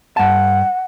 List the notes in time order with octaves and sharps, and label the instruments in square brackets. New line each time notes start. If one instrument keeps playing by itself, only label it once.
[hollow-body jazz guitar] G2 A5 [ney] F#5